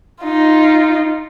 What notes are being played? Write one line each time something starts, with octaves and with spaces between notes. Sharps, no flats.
D#4 F4